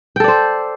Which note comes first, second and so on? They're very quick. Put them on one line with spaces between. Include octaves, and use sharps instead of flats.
G5 A4 D5 C5